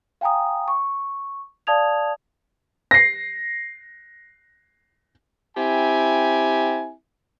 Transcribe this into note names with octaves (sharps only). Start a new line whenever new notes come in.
F5 G5 G#5 A#5 D#6
C#6
D5 F5 A5 D#6 G#6 F7
A#6 C7
C4 E4 G4 G#5